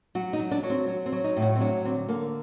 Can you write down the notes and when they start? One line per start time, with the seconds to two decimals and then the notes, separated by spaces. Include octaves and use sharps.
0.15 F#3 F#4
0.33 D#4
0.39 F#3
0.51 D4
0.63 F#3
0.70 C4
0.88 F#3
1.06 C4
1.12 F#3
1.24 D#4
1.37 A2
1.42 F#4
1.56 C4
1.60 F#3 D4
1.85 D3 C4
2.09 D3 A#3